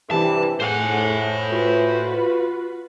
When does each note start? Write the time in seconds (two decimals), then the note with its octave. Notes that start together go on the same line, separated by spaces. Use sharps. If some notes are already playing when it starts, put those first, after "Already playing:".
0.11 G2 C3 E3 G4 A5
0.60 A2 G#4 C5 F#5 G#5
1.51 F4 F#4 B4